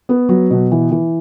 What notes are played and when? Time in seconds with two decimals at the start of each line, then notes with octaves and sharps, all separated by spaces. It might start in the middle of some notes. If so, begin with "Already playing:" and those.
0.09 B3
0.29 F#3
0.51 B2
0.71 E3
0.91 E3